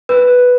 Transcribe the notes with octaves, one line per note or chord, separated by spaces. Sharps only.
B4